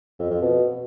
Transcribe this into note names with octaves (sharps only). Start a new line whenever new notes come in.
F2
F2
B2